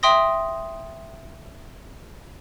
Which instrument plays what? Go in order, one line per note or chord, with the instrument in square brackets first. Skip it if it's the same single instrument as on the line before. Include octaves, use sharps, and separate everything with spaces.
[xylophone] E5 G5 C6 D#6 A#6